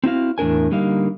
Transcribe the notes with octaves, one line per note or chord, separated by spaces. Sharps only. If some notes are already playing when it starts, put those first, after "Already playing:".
C4 E4 F#4 F5
E2 A2 D4 A#4 G#5
D3 G3 A#3 D#4 F5